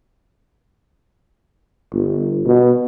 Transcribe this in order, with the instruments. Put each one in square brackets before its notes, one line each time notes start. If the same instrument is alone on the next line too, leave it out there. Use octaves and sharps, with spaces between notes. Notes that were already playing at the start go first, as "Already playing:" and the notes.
[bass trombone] G1
B2